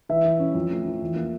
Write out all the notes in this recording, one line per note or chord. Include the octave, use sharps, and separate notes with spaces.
E3 E5
E3
C#4
F2
A3
F3
E2
A#3